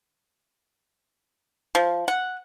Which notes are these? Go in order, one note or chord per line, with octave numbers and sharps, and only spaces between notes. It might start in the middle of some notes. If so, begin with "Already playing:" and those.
F3
F#5